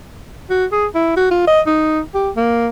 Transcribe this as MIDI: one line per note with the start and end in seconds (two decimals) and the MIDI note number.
0.50 0.65 66
0.72 0.86 68
0.95 1.13 64
1.16 1.31 66
1.31 1.43 65
1.47 1.61 75
1.67 2.01 63
2.14 2.30 67
2.37 2.68 58